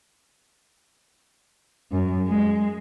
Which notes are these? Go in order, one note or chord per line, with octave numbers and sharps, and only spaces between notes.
F#2
G#3